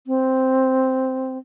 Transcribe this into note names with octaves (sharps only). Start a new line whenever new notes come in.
C4